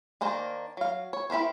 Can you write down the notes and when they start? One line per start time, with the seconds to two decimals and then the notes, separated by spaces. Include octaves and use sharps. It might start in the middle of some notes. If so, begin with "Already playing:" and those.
0.21 D#3 A#3 D4 C5 A#5
0.77 F#3 F5
1.13 C#5
1.30 E4 G4 A#4 C5